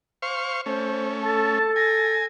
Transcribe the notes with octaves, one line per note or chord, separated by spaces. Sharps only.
C5 F5 C#6
A3 C#4 C5
A4 A5
G#5 A#6